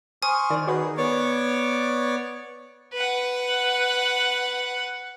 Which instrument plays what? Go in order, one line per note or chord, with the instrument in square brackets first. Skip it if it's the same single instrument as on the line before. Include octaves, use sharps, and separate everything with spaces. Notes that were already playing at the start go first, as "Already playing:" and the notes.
[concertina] C5 C#6 F6 [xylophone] G#5 D#6
[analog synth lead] D#3 [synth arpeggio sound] D5
[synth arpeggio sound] F#4 B4 [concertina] G#4
[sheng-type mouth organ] B3 C#5 D5 C#6 D6
[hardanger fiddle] B4 F#5